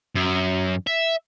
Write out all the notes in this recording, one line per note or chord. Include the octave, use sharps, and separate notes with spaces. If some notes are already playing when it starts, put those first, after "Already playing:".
F#2
E5